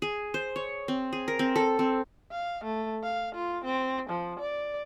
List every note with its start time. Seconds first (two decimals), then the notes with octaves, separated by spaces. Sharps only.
0.02 G#4
0.34 C5
0.56 C#5
0.88 C4
1.13 G#4
1.28 A#4
1.39 C4
1.56 A4
1.79 C4
2.32 F5
2.65 A3
3.04 F5
3.35 F4
3.65 C4
4.10 F3
4.40 D5